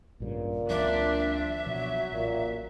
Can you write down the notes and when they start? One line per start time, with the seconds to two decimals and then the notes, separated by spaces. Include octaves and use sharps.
0.20 A1 G2 A#2 C#3
0.70 C#2 E3 F#3 C4 D4 E5
1.66 B2 F3 F#3
2.12 A1 A#2